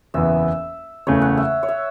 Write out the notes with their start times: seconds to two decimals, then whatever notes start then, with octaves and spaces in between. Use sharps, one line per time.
0.14 F#1 E2 E3 B3 E5
1.07 F#1 E2 C#3 E3 A3 C#5
1.22 F#5
1.37 E5
1.63 C#5
1.68 E5